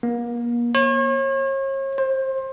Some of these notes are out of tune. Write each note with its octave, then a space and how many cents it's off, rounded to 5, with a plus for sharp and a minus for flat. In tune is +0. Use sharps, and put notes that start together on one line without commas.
A#3 +35
C#5 -40
C5 +25